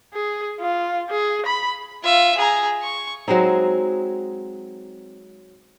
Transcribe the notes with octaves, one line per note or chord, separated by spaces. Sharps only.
G#4
F4
G#4
B5
F4 E5
G#4 A#5
C#6
F#3 G#3 C4 D#4